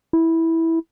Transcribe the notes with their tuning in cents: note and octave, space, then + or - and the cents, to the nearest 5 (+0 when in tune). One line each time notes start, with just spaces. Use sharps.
E4 -10